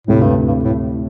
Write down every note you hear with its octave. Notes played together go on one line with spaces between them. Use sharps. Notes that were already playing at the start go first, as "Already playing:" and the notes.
D2 A2 C3 A3 E4
G2
G2
A2